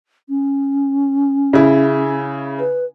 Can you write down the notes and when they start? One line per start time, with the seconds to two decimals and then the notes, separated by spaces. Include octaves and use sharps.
0.29 C#4
1.53 C#3 E4
2.59 B4